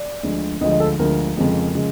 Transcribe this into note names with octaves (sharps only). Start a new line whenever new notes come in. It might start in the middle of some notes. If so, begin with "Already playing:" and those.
Already playing: D5
D2 D3 F3 G#3
D2 D3 F3 G#3 D#5
D#5
A4
D2 D3 F3 G#3 A#4
F2 C#3 F3 G#3
C#3 F3 G#3